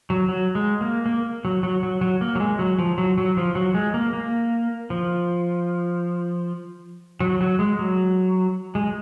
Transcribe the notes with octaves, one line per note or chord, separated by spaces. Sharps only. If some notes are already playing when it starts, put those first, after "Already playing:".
F#3
F#3
G#3
A#3
A#3
F#3
F#3
F#3
F#3
A#3
F#3
G#3
F#3
F3
F#3
F#3
F3
F#3
G#3
A#3
A#3
F3
F#3
F#3
G#3
F#3
G#3